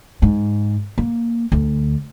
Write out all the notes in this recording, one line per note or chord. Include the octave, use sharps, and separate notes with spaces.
G#2
A#3
D2